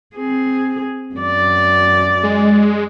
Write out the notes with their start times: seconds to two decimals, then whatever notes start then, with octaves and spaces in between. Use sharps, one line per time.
0.16 C4 G#4
1.16 F#2 D5
2.23 G#3